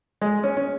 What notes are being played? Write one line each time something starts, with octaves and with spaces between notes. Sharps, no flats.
G#3
C#4
C#4